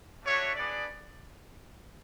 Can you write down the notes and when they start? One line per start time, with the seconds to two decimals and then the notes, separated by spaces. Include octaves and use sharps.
0.23 A3 D4 F#4 C#5 E5
0.55 B3 D4 G#4 D5